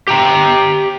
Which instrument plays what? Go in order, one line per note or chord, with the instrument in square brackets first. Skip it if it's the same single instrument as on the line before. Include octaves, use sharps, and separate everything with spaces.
[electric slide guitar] G4 G5 A#5